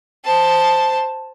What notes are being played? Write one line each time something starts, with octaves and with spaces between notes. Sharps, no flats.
C5 A5